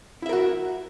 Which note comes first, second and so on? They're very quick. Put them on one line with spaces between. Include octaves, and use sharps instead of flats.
E4 E5 A#4 F#4